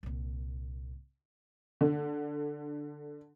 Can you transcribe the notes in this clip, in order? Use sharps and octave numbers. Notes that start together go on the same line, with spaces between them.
C2 A#2
D3